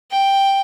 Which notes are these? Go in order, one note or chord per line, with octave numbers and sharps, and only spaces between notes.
G5